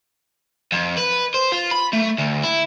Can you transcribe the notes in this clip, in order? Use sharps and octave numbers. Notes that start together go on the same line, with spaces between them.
F2
B4
C5
F4
B5
A3
D2
E4